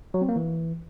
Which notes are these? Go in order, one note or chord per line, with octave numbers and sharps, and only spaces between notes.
F#3
C4
A#3
E3